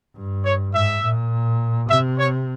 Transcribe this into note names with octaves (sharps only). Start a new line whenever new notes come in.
G2
C#5
G#2 E5
A#2
C3 E5
C#5